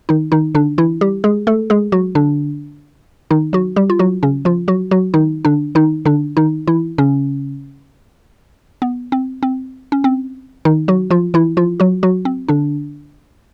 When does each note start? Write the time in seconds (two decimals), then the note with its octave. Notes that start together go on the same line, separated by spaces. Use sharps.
0.09 D#3 D#4
0.32 D#3 D#4
0.55 D3 D4
0.78 E3 E4
1.01 G3 G4
1.24 G#3 G#4
1.47 A3 A4
1.70 G#3 G#4
1.92 F#3 F#4
2.15 D3 D4
3.31 D#3 D#4
3.53 F#3 F#4
3.76 G3 G4
3.90 F4
3.99 F#3 F#4
4.23 C#3 C#4
4.45 F3 F4
4.68 F#3 F#4
4.91 F#3 F#4
5.14 D#3 D#4
5.45 D3 D4
5.75 D#3 D#4
6.05 D3 D4
6.37 D#3 D#4
6.67 E3 E4
6.98 C#3 C#4
8.82 B3
9.12 C4
9.43 C4
9.92 C#4
10.04 C4
10.65 D#3 D#4
10.88 F#3 F#4
11.10 F3 F4
11.34 E3 E4
11.57 F3 F4
11.80 F#3 F#4
12.03 F#3 F#4
12.25 C4
12.48 D3 D4